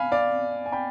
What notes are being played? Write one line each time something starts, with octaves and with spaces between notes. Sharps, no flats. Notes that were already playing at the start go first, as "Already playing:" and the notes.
Already playing: F5 G#5 B5
D5 F5
G#5
G5 B5